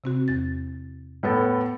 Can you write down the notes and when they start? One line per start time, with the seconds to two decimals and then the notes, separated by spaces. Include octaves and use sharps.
0.04 C3 C4 F#4
0.28 E2 A6
1.23 A2 B3 A4